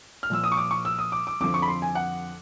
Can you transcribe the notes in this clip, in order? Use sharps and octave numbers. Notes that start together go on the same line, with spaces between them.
F6
A#2 F3 E6
D#6
C#6
D6
C#6
E6
D#6
D6
D6
F2 D3 F3 D6
C#6
B5
C6
G#5
F#5